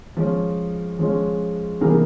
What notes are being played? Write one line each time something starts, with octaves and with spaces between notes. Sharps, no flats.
F3 G#3 C#4
F3 G#3 C#4
C3 E3 G3 A#3 G#4 A#4